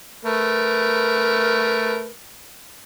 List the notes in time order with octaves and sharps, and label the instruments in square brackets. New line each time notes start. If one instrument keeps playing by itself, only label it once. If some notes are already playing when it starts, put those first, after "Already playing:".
[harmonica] A3 A#4 B4